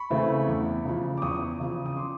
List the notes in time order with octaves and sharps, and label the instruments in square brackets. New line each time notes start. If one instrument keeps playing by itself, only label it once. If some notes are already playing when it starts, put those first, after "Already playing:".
Already playing: [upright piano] B5 C#6
C#3 E3 A3 C4
E2
C#3 F3
D6
E2 C#6 D#6
C#3 F3
D#6
C6 D6